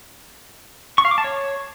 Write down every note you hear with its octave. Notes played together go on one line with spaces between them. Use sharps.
C#6
F5
D6
A5
C#5